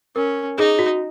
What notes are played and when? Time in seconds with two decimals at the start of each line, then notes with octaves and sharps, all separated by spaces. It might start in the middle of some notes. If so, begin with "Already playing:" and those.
0.16 C#4 A#4
0.58 D#4 G#4
0.79 F#4